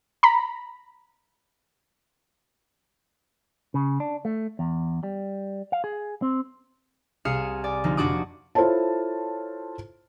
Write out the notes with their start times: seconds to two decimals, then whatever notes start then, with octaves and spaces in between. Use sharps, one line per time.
0.23 A#5 B5
3.74 C#3
4.00 D4
4.25 A3
4.59 E2
5.03 G3
5.72 F5
5.84 G#4
6.22 C4
7.25 C2 G#4 F5 D#6 C#7 E7
7.64 D5 G#5
7.84 D3 F3 A#3 D#4
7.97 F1 D4 F#4 F#5 D6 D#6
8.55 E4 F4 A4 C5 C#5 A5